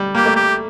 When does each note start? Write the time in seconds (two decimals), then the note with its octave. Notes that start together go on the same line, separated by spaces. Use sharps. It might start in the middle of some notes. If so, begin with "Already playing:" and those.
Already playing: G3
0.15 A#3 G4
0.26 A3
0.36 G4